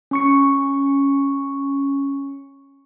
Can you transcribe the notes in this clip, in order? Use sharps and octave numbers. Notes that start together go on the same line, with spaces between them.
C#4 C#6 C#7